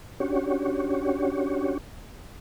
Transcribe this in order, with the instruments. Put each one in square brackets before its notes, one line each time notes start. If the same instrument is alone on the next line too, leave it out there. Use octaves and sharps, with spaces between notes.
[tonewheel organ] C#4 D4 F#4 G4 C#5